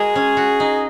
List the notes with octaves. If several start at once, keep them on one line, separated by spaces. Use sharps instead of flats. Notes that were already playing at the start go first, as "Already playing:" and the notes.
Already playing: G#3 F#4 G#4 A#4
C#4
F#4
D#4